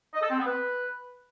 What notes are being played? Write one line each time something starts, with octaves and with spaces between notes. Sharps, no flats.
D#5
A4
C4
B3
B4